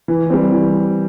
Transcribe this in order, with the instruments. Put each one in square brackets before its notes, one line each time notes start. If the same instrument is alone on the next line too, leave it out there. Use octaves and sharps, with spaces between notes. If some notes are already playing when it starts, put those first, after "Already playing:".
[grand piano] E3
G3 C4
E3